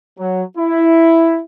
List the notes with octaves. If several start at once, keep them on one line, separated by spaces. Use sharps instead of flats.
F#3
E4